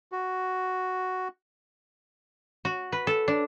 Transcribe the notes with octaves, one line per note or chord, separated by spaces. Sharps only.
F#4
F#4
B4
A4
D4